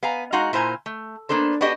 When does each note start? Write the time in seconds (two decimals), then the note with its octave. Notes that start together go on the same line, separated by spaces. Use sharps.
0.03 B3 F5 G#5 A#5
0.32 G#3 D#4 F#4 F5 F#5 A#5
0.53 A#2 E4 C5 G#5 A#5
0.86 A3
1.29 A#3 B3 D4 A4 C5
1.61 B3 D4 F#4 G4 D#5